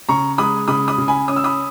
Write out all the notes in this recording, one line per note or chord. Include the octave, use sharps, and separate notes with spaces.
C#3 A#5 C#6
G#3 B5 D#6
C#3 B5 D#6
B5 D#6
C#3
G#5 B5
C#4 D#6
E6
B5 D#6